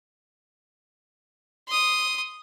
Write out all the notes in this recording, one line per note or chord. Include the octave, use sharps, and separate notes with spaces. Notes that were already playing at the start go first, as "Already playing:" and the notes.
C6 D#6